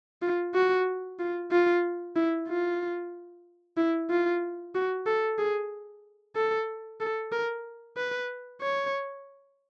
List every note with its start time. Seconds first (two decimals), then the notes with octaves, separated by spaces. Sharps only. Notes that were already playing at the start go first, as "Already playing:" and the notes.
0.22 F4
0.55 F#4
1.19 F4
1.51 F4
2.16 E4
2.48 F4
3.77 E4
4.10 F4
4.75 F#4
5.06 A4
5.39 G#4
6.36 A4
7.00 A4
7.32 A#4
7.97 B4
8.61 C#5